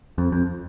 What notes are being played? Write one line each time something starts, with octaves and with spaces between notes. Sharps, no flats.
F2
F2